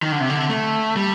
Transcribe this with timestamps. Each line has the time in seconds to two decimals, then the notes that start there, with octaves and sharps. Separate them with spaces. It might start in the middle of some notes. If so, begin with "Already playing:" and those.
0.02 D#3
0.12 D3
0.20 C3
0.30 D3
0.50 A3
0.96 G3